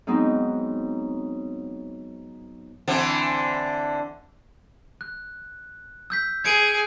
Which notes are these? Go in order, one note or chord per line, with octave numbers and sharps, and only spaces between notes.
G#2 F#3 B3 C4 D#4
D3 E3 C4
F#6
E6 G6 B6
G#4 G#6 C#7 D7